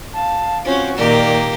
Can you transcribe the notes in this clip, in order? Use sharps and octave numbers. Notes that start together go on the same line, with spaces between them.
F5 A5
C4 C#4 F4 F#4 C5
A#2 D#3 A#3 G4 D5